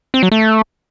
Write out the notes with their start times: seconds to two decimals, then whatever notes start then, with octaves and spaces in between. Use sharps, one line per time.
0.14 C4
0.23 F#3
0.32 A3